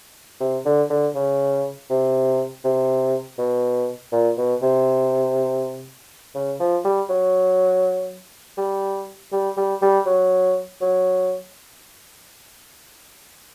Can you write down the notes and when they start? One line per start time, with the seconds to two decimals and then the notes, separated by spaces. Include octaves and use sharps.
0.40 C3
0.65 D3
0.90 D3
1.15 C#3
1.90 C3
2.64 C3
3.38 B2
4.12 A#2
4.37 B2
4.62 C3
6.35 C#3
6.60 F3
6.84 G3
7.09 F#3
8.57 G3
9.32 G3
9.57 G3
9.82 G3
10.06 F#3
10.81 F#3